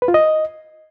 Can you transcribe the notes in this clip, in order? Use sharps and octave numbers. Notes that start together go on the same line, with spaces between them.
B4
F4
D#5